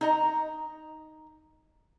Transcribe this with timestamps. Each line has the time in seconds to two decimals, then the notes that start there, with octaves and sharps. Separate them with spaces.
0.01 D#4 D#5 A#5